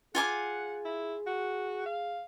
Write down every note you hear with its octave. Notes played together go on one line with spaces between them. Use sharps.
F4 G#4 F#5 G#5 D6
E4
F#4
F5